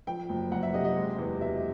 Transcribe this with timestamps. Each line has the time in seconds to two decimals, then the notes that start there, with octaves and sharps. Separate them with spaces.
0.07 F3 G5
0.29 F#1
0.52 F#1 F#5
0.63 E5
0.74 C3 D#5
0.85 D#5
0.96 G#3
1.18 E2
1.41 B2 E5